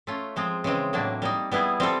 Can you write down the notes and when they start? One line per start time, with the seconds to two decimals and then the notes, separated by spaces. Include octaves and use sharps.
0.07 A3 C#4 F4
0.36 F3 G#3 C4 F4
0.64 C#3 E3 G#3 C4
0.93 A2 F#3 A#3 D4
1.22 G3 A#3 D#4
1.52 G3 B3 E4 G#4
1.80 G3 C4 F4 A4